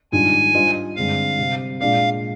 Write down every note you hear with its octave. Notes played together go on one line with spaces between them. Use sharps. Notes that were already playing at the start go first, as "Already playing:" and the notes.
G#2 D#3 G3 D4 F4 G#5
G3 D4 F4 C5 D#5
G2 D3 G#3 C4 F5
C3 G3 C4
A#2 G#3 D4 G#4 D5 F5